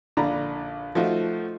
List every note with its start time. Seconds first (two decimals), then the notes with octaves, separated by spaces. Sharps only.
0.17 A#1 D3 D5 A#5 B5
0.95 F3 A3 D#4 F4 F#4